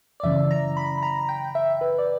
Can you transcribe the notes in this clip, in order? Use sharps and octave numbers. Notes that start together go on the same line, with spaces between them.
D5
F#2 C#3 E3 E5
A#5
B5
B5
A#5
G5
E5
B4
D5